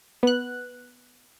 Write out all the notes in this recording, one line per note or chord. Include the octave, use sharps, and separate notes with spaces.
B3 F#6